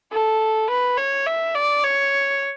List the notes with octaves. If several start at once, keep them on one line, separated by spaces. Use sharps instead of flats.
A4
B4
C#5
E5
D5
C#5